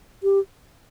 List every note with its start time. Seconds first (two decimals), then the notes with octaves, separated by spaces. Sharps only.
0.23 G4